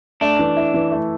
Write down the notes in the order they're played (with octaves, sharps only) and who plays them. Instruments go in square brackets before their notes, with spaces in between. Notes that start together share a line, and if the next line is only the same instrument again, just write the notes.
[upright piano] A3 [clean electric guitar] D4
[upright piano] E3
E4
E3
A3